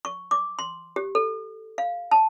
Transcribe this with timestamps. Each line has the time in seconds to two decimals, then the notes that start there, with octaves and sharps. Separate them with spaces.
0.05 C#6
0.31 D6
0.59 C6
0.96 G4
1.15 A4
1.78 F5
2.11 A5